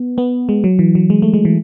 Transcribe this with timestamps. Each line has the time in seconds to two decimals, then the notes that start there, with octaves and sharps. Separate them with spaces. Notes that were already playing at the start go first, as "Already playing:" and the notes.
Already playing: B3
0.18 B3
0.49 G#3
0.64 F#3
0.79 E3
0.95 F#3
1.10 G#3
1.22 A3
1.34 G#3
1.45 E3